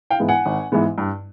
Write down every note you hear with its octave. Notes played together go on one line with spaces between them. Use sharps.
F5 G5
G#2 E3 G#3 B3
F#5 G#5
G#1
G#2 E3 G#3 B3
G2